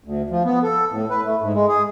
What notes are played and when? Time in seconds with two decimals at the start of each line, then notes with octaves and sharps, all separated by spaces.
0.04 D2
0.30 F3
0.44 B3
0.63 A4
0.91 A2
1.10 B4
1.25 A3
1.41 G#2
1.54 G#3
1.68 G#4